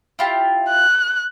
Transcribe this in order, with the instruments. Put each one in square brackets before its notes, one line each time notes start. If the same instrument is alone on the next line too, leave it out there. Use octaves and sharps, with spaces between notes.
[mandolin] E4 F4 G4
[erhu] F#6